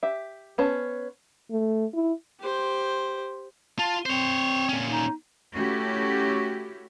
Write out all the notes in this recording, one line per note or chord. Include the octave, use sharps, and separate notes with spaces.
G4 E5
B3 C#4 C5 A5
A3
E4
G4 C5
F4 A5
C4 C5 C#5
A#2 C#4
D#4
A3 C#4 E4 F#4 G4